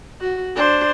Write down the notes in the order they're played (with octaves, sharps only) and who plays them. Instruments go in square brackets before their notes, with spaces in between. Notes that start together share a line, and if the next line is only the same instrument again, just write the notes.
[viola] F#4
D4 C5